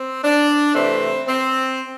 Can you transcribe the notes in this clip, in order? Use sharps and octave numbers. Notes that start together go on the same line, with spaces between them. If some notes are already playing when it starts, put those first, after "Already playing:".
Already playing: C4
D4
C3 E3 A3 C4
C4